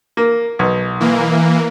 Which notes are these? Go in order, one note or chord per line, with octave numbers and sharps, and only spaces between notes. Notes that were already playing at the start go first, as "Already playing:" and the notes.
A#3
B1
E3 A#3